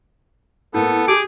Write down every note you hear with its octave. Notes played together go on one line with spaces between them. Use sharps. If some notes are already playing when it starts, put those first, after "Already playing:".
A2 A#3 B3 A4
G4 G#4 D6